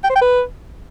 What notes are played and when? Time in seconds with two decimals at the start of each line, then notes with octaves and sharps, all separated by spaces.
0.04 G5
0.10 C5
0.16 G5
0.21 B4